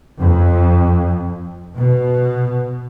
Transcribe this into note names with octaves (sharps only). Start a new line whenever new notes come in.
F2
B2